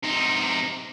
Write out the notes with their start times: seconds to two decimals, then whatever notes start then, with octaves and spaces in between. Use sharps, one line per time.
0.03 C3 D#4